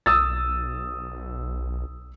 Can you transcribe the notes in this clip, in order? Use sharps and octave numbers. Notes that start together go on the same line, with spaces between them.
B1 D#6 E6 A6